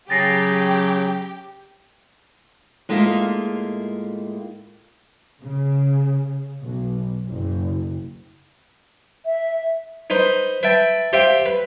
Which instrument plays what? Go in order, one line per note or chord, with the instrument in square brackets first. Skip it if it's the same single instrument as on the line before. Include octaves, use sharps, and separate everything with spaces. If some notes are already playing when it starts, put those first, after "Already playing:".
[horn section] C#3 [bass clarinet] F#3 [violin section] G4 [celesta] A6 A#6 C7
[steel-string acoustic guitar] A2 G#3 A#3 D#4 F4 E5
[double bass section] C#3
B1
F#1
[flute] E5
[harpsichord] D#4 B4 C5
B4 E5 G5 A5
G4 C5 E5 F5 G5
B4